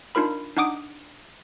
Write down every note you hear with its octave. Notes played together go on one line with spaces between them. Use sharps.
D4 D#4 F4 A#4 B5
D4 D#4 F#5 D6 D#6 D7